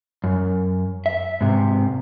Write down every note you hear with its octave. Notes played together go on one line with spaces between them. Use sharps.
F#2
E5
G#2 C3